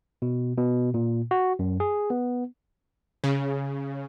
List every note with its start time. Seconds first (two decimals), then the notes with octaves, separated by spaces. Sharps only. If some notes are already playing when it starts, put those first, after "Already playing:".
0.22 B2
0.58 B2
0.94 A#2
1.31 F#4
1.59 F#2
1.80 G#4
2.10 B3
3.24 C#3